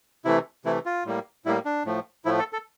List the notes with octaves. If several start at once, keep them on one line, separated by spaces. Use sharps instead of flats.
C3 E3 A3 E4
C3 E3 A3 E4
F4
A2 G3 A#3
A2 G3 A#3 E4
D4
A2 F3 A3
A2 F3 A3 E4
A4
A4